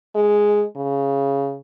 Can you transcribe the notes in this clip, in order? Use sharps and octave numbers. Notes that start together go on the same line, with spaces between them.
G#3
C#3